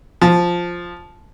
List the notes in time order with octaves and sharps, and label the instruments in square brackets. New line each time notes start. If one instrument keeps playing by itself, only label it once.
[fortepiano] F3